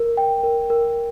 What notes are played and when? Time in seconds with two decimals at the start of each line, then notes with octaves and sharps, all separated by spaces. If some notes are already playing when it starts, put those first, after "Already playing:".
Already playing: A#4
0.17 G5
0.43 A#4
0.70 A#4